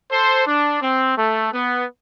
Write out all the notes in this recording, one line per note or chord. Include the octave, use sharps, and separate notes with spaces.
A4 C5
D4
C4
A3
B3